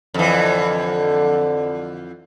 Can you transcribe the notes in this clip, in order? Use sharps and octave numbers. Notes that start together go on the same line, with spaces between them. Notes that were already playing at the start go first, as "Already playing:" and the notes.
F2 D3 E3